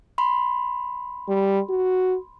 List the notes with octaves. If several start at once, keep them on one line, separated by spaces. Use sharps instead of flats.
B5 C6
G3
F#4